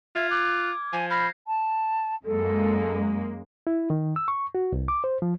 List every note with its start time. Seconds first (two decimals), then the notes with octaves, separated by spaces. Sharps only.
0.16 F4 E5 F6 G#6
0.31 D6 F#6
0.93 F3 G#5
1.11 B5 F6 G6 A#6 C7
1.47 A5
2.25 F#2 G#3 A#3 A4
3.67 E4
3.90 D#3
4.16 E6
4.28 C#6
4.55 F#4
4.72 C2
4.88 D6
5.04 C5
5.22 F3